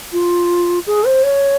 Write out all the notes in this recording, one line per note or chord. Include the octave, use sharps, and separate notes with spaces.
F4
G#4
C5
C#5